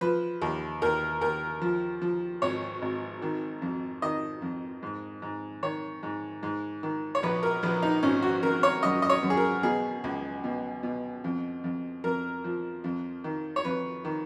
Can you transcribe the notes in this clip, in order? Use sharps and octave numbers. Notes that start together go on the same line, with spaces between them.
F3 B4
D#2
D#2 A#4
D#2 A#4
F3
F3
G#1 C#5
G#1
D#3
F2
D#3 D#5
F2
G#2
G#2
D#3 C#5
G#2
G#2
D#3
C#5
A#1 B4
A#4
A#1 B4
D#4
G#1 C#4
F#4
C#3 A#4
C#5
F#2 D#5
D#5
C#5
F#2
G#4
A#4
B2 G#4
C#2
B2
B2
F2
F2
F2 A#4
F3
F2
D#3
C#5
F2 B4
D#3